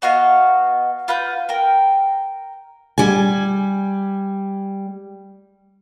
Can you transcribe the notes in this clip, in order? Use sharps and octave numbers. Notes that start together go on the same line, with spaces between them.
B3 F#4 D#5 F5
F4 B4 F#5 G6
A#4 G5
G3 G#5